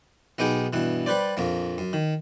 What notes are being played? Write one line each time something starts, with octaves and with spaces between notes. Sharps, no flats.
B1 B3 D#4 G4 G#4 G5
G2 B2 E3
G3 B4 C5 D5
A#1 F2 A#3
F#2
D#3